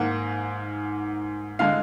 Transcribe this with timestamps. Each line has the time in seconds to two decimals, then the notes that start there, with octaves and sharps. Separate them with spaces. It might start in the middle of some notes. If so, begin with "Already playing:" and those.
Already playing: G#2 D#3 A#3 F#5
1.59 D3 G#3 F5